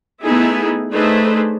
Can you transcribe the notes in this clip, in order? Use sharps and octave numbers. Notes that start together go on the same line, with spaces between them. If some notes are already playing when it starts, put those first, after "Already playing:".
A3 B3 D#4 E4 G#4
A3 D4 D#4 G#4 B4 C5